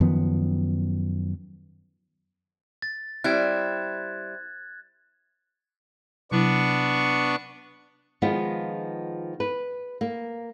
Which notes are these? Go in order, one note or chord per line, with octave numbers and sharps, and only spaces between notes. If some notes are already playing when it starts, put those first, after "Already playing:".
F#2 D#3 F3 B3
A6
G3 C4 E4 F#6 G#6
C3 F#3 B3 D4 E4 C#6
D#3 F3 G#3 B3 F4
B4
A#3